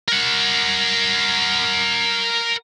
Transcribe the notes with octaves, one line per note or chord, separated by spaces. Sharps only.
A#4 F#5